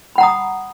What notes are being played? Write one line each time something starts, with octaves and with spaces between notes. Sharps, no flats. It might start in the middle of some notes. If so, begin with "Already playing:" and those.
F#5 A#5 B5 D#6